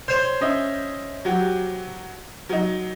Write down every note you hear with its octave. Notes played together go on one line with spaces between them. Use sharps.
C5 C#5 C6 G6
C#4 D#5 E5
F#3 F#4 G4
F#3 D#4